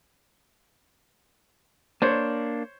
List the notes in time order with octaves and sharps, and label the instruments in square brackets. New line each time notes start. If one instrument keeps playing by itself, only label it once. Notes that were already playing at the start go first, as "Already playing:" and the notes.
[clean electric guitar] A#3 D4 [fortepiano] C5 C#5